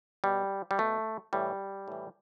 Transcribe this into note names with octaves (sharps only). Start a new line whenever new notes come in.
B2 G3
G3
B2 A3
A2 E3 G3
A2 E3